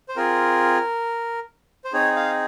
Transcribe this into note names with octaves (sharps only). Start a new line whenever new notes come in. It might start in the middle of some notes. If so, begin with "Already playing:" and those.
C5
C4 F4 G#4 A#4
C5
C4 D#4 G#4 C#5
F5